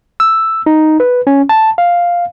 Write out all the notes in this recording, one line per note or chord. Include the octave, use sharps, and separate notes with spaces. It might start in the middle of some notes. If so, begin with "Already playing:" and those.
E6
D#4
B4
C#4
A5
F5